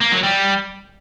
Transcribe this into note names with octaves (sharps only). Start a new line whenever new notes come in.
A#3
F#3
G3